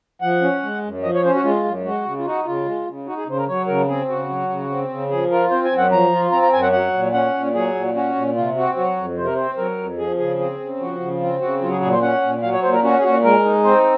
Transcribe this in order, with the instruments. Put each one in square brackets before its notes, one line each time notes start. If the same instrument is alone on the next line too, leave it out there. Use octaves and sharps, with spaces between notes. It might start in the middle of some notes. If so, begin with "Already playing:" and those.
[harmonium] F3 F#5
C#4
G#3
F#2
F3 D#5
C#5
C#4 C5
F#4
G#3 F4
F#2
G#3 F#4
C#3
F4
D#4 F#4
C#3 F4
G#3
C#3
D#4 F#4
G#4
C#3 C5
A#4
F#3 C#5
C#3 A#4
C4 G#4
C#3 F#4
F#3
C#3
C4
C#3
F3 G#4
F4 A#4
C4 C5
G#5
F#2
F#5
F3 A#5
F4
C4 A#5
A#5
F#2 G#5
F#5
F#3 F#5
A#2
C#4 F#5
A#2
F#3 G#4
A#2
C#4 F#4
A#2
C3 F4
C4 F#4
F#3 F#4
F2
C3 C5
A#4
C4 C5
F#3 A#4
F2
F3 G#4
C#3 G#4
C4 G#4
C#3
F3 F#4
C#3
C4 F4
C#3 F#4
F#3 F4
G#4
A#2 G#4
C5
C#4 F#5
A#2
F#3 F5
C#5
A#2 C5
A#4
C#4 F#4
G#4
A#2 F#4
G#3 A#4
D#4
C4 C5